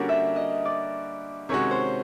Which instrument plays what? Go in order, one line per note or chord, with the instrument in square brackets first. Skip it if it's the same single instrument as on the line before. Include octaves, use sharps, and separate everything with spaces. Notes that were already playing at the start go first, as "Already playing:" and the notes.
Already playing: [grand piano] D3 G3 A#3 C#4 F#4 [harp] D5
[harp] E5
D#5
D5
[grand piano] C3 D#3 G#3 C#4 F#4 [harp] C#5
[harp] C5